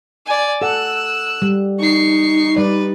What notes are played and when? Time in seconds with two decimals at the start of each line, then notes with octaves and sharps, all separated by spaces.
0.26 D5 G#5
0.62 A4 F#5 E6 F#6
1.42 G3
1.79 D#4 C#6 C7
2.56 G3 B4 D5